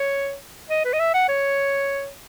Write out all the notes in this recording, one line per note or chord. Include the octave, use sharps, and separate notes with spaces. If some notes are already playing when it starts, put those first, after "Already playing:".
Already playing: C#5
D#5
B4
D#5
E5
F#5
C#5